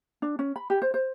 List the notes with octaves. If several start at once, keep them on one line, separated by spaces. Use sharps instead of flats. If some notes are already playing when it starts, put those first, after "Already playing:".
D4
C#4
B5
G4
C5
C5